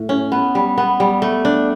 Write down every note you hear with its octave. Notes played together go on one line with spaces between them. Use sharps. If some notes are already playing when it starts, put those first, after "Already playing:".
Already playing: A2
C#4
B3
G3
B3
G3
A3
D4